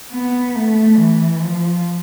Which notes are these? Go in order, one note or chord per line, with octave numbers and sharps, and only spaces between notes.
B3
A3
E3
F3